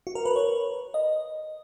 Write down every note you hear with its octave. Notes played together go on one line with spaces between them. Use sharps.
F#4
A#4
B4
C#5
D#5